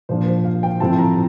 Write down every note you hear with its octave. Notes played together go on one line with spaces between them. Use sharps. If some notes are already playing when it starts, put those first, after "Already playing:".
A#2 F3 A#3 D4 C5
C5
F5
G5
A2 F3 C4 E4 A5
A#5